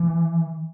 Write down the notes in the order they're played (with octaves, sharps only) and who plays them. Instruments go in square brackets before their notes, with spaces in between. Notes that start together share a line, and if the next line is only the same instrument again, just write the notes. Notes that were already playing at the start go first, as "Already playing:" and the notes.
Already playing: [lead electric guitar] E3